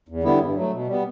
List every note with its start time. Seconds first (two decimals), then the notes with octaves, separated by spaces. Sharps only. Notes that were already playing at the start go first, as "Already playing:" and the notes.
0.08 E2
0.23 D3 G3 B3 E4
0.40 G2
0.55 F#3 A3
0.72 B2
0.87 G3 B3